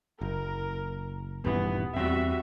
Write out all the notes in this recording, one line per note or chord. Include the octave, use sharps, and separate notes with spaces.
F#1 A#4
D#1 G2 E3 B3
E2 G3 C4 F#4 E5